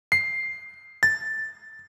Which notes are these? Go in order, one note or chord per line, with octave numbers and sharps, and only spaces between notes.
C7
A6